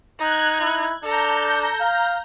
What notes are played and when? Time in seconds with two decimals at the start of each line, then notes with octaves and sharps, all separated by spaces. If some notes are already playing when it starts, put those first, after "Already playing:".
0.19 D#4 F#6 G#6
0.61 E4
1.04 D4 A4 A#5 G6
1.81 F5